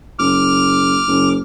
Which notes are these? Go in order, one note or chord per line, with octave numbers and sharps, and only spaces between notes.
F#1 D6 F6
F#1